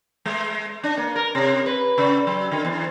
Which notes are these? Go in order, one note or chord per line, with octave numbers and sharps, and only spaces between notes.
G#3
D4
A#3
A#4
C3
B4
C#3
F#3
D3
E2